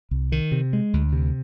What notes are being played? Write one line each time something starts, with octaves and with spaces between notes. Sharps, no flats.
C2
D#3
C3
G#3
D2
C3